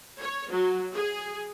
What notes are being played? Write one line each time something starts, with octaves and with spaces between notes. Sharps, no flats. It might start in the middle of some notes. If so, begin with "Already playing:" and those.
C#5
F#3
G#4